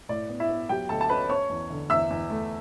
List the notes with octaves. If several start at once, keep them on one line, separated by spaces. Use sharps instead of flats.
A2 D5
B3
E4 E5
B3
F#3 G4 G5
D2 A4 A5
A5
C#4 B4 B5
C#4 C#5 C#6
E2
D3
E2 E5 E6
E2
A3